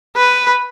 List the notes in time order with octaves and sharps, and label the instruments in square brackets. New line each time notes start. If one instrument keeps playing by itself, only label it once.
[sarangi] B4